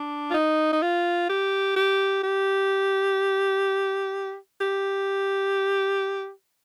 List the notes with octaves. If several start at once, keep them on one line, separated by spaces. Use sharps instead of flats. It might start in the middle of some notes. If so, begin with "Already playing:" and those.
Already playing: D4
F4
D#4
D#4
F4
G4
G4
G4
G4